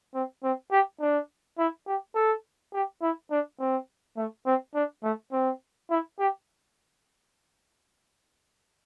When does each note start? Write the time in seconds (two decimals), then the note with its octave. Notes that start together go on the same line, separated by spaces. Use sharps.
0.14 C4
0.43 C4
0.71 G4
1.01 D4
1.58 E4
1.87 G4
2.15 A4
2.74 G4
3.02 E4
3.31 D4
3.59 C4
4.17 A3
4.46 C4
4.75 D4
5.03 A3
5.32 C4
5.90 E4
6.19 G4